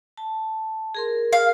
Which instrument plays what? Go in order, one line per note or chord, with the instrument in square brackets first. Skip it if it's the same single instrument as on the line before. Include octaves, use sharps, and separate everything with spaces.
[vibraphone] A5
G#4 A#4 C6
[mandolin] F5